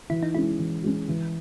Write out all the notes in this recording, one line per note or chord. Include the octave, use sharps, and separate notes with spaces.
E3 E4
D#4
G#3 C#4 E4
E3
G#3 C#4
E3